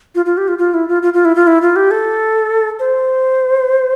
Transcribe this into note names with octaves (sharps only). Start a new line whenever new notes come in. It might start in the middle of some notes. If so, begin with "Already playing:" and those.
F4
F4
G4
F4
F4
E4
F4
F4
F4
E4
F4
E4
F4
G4
A4
C5